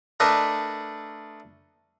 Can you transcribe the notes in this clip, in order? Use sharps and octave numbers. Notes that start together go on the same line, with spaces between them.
A3 D4 A#4 B4 D5 D#5